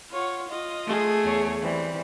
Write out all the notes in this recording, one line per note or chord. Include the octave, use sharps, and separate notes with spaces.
F4 C#5 F#5
F4 D#5
A3 G#4
E2 C#5
E3 G3 C4